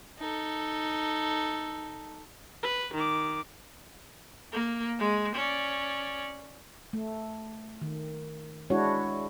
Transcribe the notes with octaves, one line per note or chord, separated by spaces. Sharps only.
D#4 A4
B4
D#3 D6
A#3
G#3
C#4 D5
A3
D#3
G#3 D4 E4 F#4 C#5